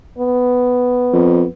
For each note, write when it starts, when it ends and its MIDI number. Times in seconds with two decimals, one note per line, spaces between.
0.19 1.49 59
1.13 1.43 41